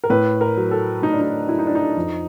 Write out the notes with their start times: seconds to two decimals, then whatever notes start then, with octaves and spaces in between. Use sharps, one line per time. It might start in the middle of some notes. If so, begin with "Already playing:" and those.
0.04 A#4
0.10 A2 B4
0.41 A#4
0.57 F#3
0.71 A4
1.02 A2 D#4
1.13 D4
1.21 D#4
1.49 F#3 E4
1.59 D#4
1.67 D4
1.75 D#4
1.96 F2